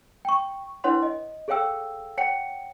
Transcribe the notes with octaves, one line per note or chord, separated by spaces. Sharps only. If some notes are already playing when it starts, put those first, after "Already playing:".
G5 C#6
D4 E4 B4 C#5 F#5 C6
D#5
G#4 A4 C#5 F5 G5 E6
C#5 F#5 G5 C#7